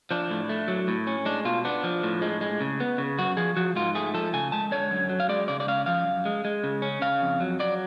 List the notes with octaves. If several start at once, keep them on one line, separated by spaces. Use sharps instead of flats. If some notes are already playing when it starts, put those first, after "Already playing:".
F3 D4
A2
A3
F#3
A2
C#4
G#3 D4
B2 F4
B3 D4
F3
A2
G#3
G#3
C#3
B3
C#3
F#2 F#4
F3 G#4
F3 F#4
G#2 F4
A3 G#4
F3 A4
C#3 G#5
G#3 A5
D3 C#5
F#2
F#3
F5
G#3 D5
C#3 D5
D5
C#4 F5
F3 F5
F#2
G#3
G#3
C#3
C#4
C#3 F5
F2
F#3
F#3 D5